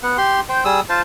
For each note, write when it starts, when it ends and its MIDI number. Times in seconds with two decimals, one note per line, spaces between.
0.03 0.17 59
0.03 0.17 78
0.18 0.40 67
0.18 0.40 84
0.49 0.64 72
0.49 0.64 79
0.65 0.80 55
0.65 0.80 68
0.65 0.80 87
0.65 0.80 88
0.89 1.02 65
0.89 1.02 72
0.89 1.02 81